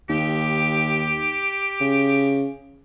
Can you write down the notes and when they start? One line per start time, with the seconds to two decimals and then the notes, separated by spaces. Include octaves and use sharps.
0.09 D#2 G4
1.80 C#3